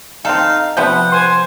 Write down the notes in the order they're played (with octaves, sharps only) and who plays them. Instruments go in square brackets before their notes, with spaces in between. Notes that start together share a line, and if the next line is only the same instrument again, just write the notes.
[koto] C4 A4 [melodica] D#4 F5
[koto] C3 F3 B3 [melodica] F#5 [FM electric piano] G6
[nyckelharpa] C5 G#5 [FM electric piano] C6 G6